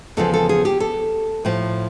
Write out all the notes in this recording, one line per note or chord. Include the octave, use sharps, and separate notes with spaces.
E2 C#3 F3 A4
A4
G#4
G4
A4
A2 F3